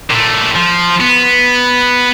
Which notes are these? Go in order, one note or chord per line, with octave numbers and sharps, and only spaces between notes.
A#2 A3
F3
B3